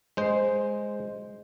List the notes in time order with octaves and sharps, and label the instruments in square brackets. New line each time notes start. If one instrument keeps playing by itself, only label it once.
[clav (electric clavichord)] G#3 C5